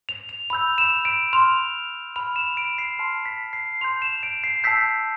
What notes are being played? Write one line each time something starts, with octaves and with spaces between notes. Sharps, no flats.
F7
F7
B5 E6 G6 F7
E7
D7
C6 F6 F7
B5 F6 F7
E7
D7
C7
A5 C6 F6
B6
C7
C6 G6 F7
E7
D7
C7
A5 E6 G6 B6